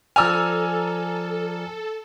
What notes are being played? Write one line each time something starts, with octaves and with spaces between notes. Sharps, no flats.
F3 A4 D5 G#5 A#5 E6 F6